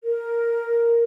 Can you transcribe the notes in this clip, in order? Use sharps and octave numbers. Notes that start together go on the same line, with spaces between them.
A#4